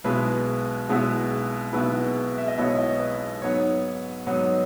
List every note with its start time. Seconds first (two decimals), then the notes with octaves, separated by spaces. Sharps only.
0.04 B1 B2 G#3 B3 E4 B4
0.88 B1 B2 G#3 B3 E4 G#4
1.73 B1 B2 G#3 B3 E4 B4
2.38 E5
2.48 D#5
2.58 B1 B2 G#3 B3 E4 C#5
2.78 D#5
3.00 B4
3.42 G#2 F#3 B3 D#4 C#5
4.27 G#2 F#3 B3 D#4